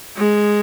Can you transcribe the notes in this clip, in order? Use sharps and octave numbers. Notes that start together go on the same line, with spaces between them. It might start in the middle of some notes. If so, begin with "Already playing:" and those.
G#3